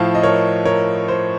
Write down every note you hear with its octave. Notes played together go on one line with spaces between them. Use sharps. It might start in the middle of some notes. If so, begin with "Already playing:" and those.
Already playing: A2 F3 F5 A5
D#5
A#4 C#5
A#4 C#5
C5